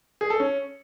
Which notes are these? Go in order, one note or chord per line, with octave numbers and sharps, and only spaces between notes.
G#4
A4
C#4